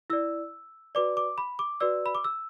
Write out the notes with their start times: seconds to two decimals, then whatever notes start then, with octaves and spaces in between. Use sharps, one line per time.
0.10 E4 D5 E6
0.95 F#4 B4 D5 D6
1.17 D6
1.38 B5
1.59 D6
1.80 F#4 B4 D5 E6
2.06 B5
2.15 D6
2.24 E6